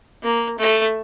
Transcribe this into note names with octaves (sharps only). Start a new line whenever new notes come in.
A#3
A3